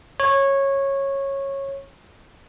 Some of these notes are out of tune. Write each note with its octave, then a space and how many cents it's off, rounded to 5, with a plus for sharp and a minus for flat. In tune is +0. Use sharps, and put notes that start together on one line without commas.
C#5 -15